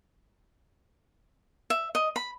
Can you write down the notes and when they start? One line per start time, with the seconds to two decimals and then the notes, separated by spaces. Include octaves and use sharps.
1.70 E5
1.95 D#5
2.16 B5